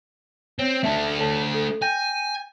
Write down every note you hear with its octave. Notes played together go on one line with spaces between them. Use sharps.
C4 C#5
A3 D4 E5 A5
A4 C#5 A5
A4
G5 G#5 G6 A#6